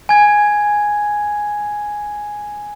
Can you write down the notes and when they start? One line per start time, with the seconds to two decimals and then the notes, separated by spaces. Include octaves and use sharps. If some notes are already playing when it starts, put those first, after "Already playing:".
0.09 G#5 G#6